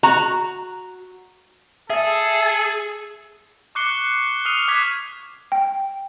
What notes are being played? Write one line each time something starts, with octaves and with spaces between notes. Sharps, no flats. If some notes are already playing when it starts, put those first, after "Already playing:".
F#4 A#5
G#4 A4 E5
C#6 D6 F#6 C7 C#7 G7
D#6 F6 C7 D#7 F7
C#6 D6 F6 F#6 G#6 B6
G5